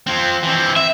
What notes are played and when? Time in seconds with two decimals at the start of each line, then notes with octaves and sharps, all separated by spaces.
0.07 F3 C4
0.43 E3 C4
0.76 E5